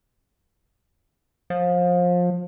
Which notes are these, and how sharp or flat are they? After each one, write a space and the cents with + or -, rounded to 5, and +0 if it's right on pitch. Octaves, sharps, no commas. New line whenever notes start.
F3 +25